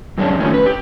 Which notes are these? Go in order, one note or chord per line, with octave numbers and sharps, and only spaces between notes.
F#2 G3 G#3 C#4 D4
D#3 F3 A3 C#4
B4
G4